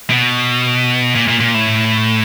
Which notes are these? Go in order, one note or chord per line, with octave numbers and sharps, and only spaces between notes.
B2
A#2
A#2
A#2
A2